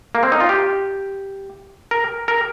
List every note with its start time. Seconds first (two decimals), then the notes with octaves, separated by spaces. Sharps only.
0.15 A#3
0.23 C4
0.32 D#4
0.40 F4
0.49 G4
1.91 A#4
2.28 A#4